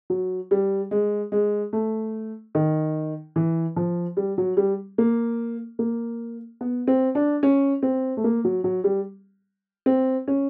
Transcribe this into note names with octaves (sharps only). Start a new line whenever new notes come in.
F#3
G3
G#3
G#3
A3
D#3
E3
F3
G3
F#3
G3
A#3
A#3
B3
C4
D4
C#4
C4
A3
A#3
F#3
F#3
G3
C4
C#4